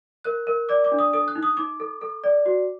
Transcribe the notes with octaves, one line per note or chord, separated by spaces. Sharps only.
A#4 F#6
A#4
D5 D6
D6
D4
D#6
A4 D#6
F#6
D#4
D#6
D#4 D6
A4
A4
D5
F#4